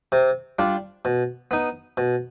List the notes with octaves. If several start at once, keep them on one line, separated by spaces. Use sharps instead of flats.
C3
G3 D4 F4
B2
B3 D#4
B2